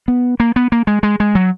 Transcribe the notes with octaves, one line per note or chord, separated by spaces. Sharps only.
B3
A#3
B3
A#3
G#3
G#3
G#3
F#3